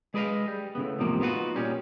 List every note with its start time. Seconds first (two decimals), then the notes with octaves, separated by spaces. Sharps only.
0.14 G#3 G#4 B4 D5 D#5 F5
0.47 G3
0.75 A2 C#3 B3
0.99 E2 G#2 C3 F3 A#3
1.20 B3 D#4 F4 F#4 B4
1.55 A#2 G3 C#4